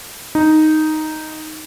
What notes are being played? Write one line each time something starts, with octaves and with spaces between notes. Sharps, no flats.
D#4